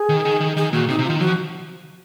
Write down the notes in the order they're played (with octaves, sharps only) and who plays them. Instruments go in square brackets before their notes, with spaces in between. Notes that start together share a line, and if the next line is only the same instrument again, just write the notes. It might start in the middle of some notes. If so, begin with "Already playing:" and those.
Already playing: [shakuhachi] G#4
[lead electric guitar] D#3
D#3
D#3
[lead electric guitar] D#3 [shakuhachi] G#4
[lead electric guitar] A#2 [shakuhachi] F#4
[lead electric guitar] C3 [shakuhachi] D#4
[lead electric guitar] C3
[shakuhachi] F4
[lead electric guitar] D#3
[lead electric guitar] F3 [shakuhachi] F#4